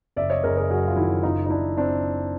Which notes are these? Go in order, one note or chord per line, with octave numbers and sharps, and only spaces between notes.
F#1 D5 E5
C#5 D#5
F#1 G#4 A#4
G#4 A#4
F#2 F#4 G#4
F4
D#3 E4 F#4
F#1 D#4 F4
D#4
F#1 D4 E4
C4 D4